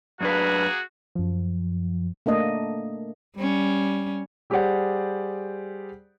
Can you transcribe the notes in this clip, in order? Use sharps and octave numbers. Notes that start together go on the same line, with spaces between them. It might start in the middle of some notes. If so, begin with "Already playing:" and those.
F#2 A#3 D4 F#4 G#4 B4
F#2 F3
A3 A#3 D4 D#5
G3 C#4
G3 G4 G#4 C5 D5 F#5